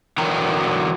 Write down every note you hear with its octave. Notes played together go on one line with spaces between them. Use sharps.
D3 E3 F#3 A#4 G5 A#5